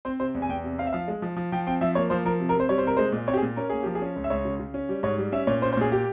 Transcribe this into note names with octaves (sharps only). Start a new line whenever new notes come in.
C4 C5
C3 C5
E2
G#5
E2 G5
C3
C4 F5
E5
F3 F5
G#3
F3
F3
F3 G5
C4 G5
F3 E5
A#3 C#5
F3 C5
F3 A#4
C3
A#4
C3 C5
G3 C#5
C5
C3 A#4
G#3 C5
A#2
C4 C#5
G4
G#4
A#2
C#4 A#4
A#3 G#4
F3 G4
G#4
C#4
C#2
E5
C#2 C#5
C#3
C#3
C#4
G3
G#2 C#5
G3
C#4 E5
A#2 C#5
C#4 C5
C5
A#2 G#4
G4